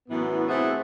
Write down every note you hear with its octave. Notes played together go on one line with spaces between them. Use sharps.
F#2 A2 E3 B3
C3 A3 E4 G#4 C5 F#5